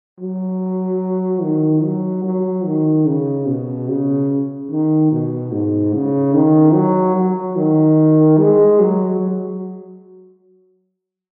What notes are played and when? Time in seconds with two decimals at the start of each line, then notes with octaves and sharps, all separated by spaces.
0.20 F#3
1.43 D#3
1.84 F#3
2.24 F#3
2.66 D#3
3.06 C#3
3.47 B2
3.89 C#3
4.71 D#3
5.12 B2
5.52 G#2
5.93 C#3
6.34 D#3
6.74 F#3
7.16 F#3
7.57 D#3
8.38 G#3
8.80 F#3
9.21 F#3